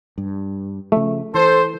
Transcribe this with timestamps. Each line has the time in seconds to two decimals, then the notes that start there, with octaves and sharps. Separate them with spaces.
0.18 G2
0.92 C#3 F3 A3
1.34 E3 A4 C5